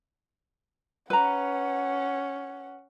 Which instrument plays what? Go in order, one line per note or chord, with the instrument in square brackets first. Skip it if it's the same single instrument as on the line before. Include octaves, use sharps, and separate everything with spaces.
[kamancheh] C#4 F#5 [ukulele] B4 A#5